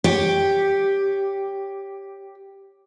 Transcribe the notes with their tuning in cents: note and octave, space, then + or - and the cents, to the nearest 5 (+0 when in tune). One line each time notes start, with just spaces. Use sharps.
G4 +0 C#5 +0